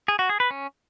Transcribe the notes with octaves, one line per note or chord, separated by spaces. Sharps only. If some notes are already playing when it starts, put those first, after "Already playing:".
G#4
F#4
G#4
B4
C#4